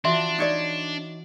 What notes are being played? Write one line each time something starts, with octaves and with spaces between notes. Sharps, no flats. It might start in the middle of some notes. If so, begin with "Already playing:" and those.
E3 D4 F4 F#4 E5 C6
D#4 C#5 D5